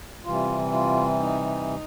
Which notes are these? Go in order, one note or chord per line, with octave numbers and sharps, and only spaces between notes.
C3 E3 G3 F4
F4
D#4